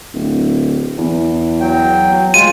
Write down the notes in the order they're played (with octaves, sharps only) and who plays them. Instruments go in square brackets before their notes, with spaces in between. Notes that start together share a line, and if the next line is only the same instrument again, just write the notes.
[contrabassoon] D1
E2
[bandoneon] F#3 G5
[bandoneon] G#3 F4 [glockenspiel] D#7